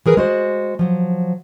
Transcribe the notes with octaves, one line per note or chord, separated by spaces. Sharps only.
E3 G#4 A#4 B4
G#3 F#4 C5
F3 F#3